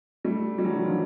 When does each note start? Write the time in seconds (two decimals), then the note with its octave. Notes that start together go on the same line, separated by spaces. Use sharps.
0.25 G3 A3
0.58 G3
0.64 E3 F#3
0.75 D3 E3
0.84 D#3 F3